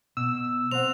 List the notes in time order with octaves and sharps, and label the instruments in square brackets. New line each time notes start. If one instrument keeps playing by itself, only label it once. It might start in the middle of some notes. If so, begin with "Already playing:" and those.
[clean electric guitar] B2 [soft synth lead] E6
[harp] C4 F#5 [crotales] F7